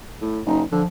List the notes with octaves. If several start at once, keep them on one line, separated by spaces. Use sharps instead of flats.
A2
F#1 D#4
D3 F3